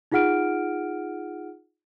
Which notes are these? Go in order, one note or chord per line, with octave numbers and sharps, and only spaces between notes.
D#4 F4 G#4 F#5 F6 D7